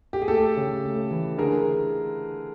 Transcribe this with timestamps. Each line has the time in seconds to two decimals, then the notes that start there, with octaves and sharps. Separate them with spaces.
0.13 G4
0.22 G#4
0.28 A3 G4 A4
0.57 C#3
0.84 A3
1.11 E3
1.38 D3 G#4 A#4